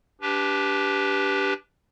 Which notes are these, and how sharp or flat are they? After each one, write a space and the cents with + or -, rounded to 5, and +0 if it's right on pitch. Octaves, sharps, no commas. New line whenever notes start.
D4 -25 G4 +0 B4 +0